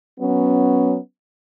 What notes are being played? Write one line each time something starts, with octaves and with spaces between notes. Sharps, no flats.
F#3 B3 C#4